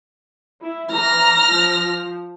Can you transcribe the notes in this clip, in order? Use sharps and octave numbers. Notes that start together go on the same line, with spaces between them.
E4
E3 A#5 F6 A#6
F3